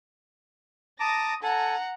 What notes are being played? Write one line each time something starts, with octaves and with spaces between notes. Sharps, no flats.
A5 A#5 D6 D#6 A#6
A4 F#5 G#5 A#5